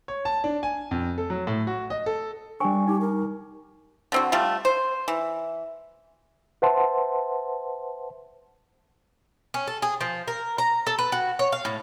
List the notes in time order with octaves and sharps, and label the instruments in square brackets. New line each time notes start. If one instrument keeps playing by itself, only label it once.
[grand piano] C#5
A5
D4
G#5
F2
A4
F#3
A2
F#4
D#5
A4
[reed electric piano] G3 C#6 [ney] D4 [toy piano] A#4 G5 G#5
[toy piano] D#4 [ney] G4
[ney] A#4
[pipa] D3 C4 F#4
G3 A3 F4
C5
E3
[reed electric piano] B4 C5 E5 F#5 A5 C6
[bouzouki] C#4
A4
G#4
F3
A#4
A#5
A4
B4
F#4
C#5
F5
A2